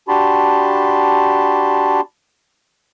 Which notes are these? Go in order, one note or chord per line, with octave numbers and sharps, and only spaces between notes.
D4 F#4 G4 A5 B5 C6